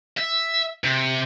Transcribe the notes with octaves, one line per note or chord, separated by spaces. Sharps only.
E5
C3